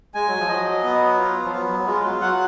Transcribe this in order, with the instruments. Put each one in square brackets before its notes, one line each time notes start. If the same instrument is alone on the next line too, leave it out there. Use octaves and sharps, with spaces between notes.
[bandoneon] G#3 [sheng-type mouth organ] G#5
[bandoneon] F#3
F3
[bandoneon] F#3 [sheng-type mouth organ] D#5
[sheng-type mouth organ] B3
F4
[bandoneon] F3
[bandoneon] F#3 [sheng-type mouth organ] B3
[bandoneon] F#3
F#3
[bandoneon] G#3 [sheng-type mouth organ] F4
[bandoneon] F#3
[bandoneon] F#3 [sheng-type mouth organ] F#5